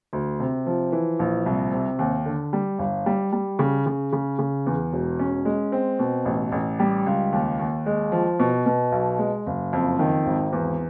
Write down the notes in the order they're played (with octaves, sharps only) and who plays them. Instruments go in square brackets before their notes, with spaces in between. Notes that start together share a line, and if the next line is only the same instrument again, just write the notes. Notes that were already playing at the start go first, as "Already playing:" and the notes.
[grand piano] D2
C3
F3
E3
A#1
C2
C3
D#2
D3
G3
G1
G3
G3
C#3
C#3
C#3
C#3
E2
E1
C#4
G#3
C4
B2
A1
A1
G3
C#2
D#2
D#2
G#3
F3
B2
B2
B1
G#3
F#1
F2
D#3
G#1
E2